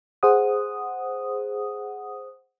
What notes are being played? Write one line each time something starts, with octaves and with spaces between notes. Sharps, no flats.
G#4 C5 F#5 D#6